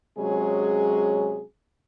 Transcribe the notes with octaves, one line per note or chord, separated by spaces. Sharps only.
C3 F#3 G#3 C#4 G#4